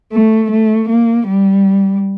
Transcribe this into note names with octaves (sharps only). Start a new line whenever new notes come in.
A3
A3
A#3
G3